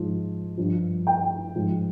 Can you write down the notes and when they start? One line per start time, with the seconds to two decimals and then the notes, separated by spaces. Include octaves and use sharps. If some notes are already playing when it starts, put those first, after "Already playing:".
Already playing: G#2 F3
0.58 G2 F3
1.07 G5
1.56 G#2 F3